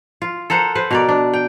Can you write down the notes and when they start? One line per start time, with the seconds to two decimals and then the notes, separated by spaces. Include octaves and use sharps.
0.22 F4
0.50 A4 A#4 C5 F#5
0.75 B4 C5
0.91 B2 A#4 D5
1.09 D4
1.33 G5